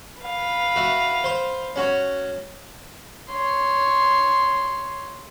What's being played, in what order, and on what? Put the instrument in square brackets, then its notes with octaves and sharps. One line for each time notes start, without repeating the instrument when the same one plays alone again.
[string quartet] B4 F5
[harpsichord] F#4 E5
C5 C6
C#4 F#4 C#5
[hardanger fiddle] C#5 C6